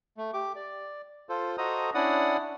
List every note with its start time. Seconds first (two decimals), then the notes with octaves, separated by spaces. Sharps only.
0.17 A3
0.34 G4 D6
0.56 D5
1.29 F4 A4 C5
1.58 F#4 A4 C5 D#5 A#5 D#6
1.94 C#4 D4 E4 D5 F#5 D#6